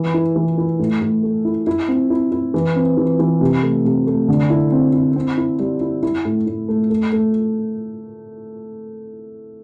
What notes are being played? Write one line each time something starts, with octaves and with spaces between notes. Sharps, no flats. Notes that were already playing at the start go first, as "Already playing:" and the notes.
Already playing: E3
E4
E3
E4
A2
A2
A3
E4
E4
C4
E4
E4
E3
C4
E3
E3
C3
A3
C3
A3
D3
E4
C4
E4
C4
E4
G3
E4
E4
A2
A2
A3
A3
A3